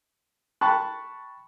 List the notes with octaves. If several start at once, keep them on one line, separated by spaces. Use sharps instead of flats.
G5 A5 B5 C#6 F#6